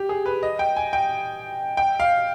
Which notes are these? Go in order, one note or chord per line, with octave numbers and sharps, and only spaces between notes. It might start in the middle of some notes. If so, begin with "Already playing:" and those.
Already playing: G4
G#4
B4
D#5
G5
G#5
G5
G5
F5